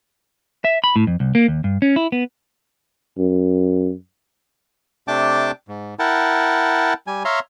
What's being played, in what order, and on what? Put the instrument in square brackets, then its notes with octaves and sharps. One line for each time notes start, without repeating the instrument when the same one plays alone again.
[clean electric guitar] E5
B5
A2
F2
C2
A#3
D#2
G2
C#4
E4
B3
[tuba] F#2
[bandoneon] C3 A3 D4 G5 A5 D6
G#2
E4 A#4 F#5 G5 A5
G3 G#5
C#5 E5 F5 A#5 C6